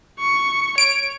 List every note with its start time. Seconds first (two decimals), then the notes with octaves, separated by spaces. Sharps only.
0.19 C#6
0.78 C#5 D7